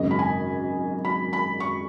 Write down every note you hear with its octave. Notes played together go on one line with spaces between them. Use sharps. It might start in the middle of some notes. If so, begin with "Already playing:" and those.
Already playing: G#1 F#2 C#3 D#5
B5
G#5
B5
B5
C#6